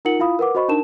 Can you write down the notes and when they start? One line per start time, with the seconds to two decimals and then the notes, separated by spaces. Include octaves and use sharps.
0.05 D#4 F4 A#4 F#5 C#7 F#7
0.19 E4 F4 F5 B5 D#6
0.39 A#4 B4 F#5 D6
0.55 F#4 C5 D#5 B5 C#6
0.69 D4 D#4 A#4 A5 E7